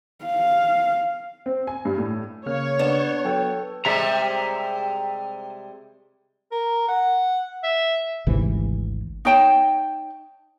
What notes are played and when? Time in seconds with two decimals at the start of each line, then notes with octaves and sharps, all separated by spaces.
0.25 F5
1.46 C4
1.67 G#5
1.85 G2
1.98 A2
2.46 C#3 A#3 C#5 F6
2.79 B3 D4 D5 E7
3.25 F#3 A4 G5
3.85 C3 G3 G#3 E5 A#5
6.51 A#4
6.88 F#5
7.63 E5
8.27 G#1 D2 C3 E3
9.25 D#4 C#5 G5 A5